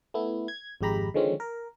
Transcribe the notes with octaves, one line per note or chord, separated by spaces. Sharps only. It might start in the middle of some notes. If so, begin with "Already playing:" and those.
A3 B3 E4
G#6
G#1 F2 G#3 G4 A#5 B5
D3 D#3 F3 G#3 C4 C#4
A#4